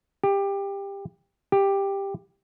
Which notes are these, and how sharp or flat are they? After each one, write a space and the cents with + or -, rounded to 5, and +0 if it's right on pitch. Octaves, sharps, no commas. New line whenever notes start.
G4 +20
G4 +10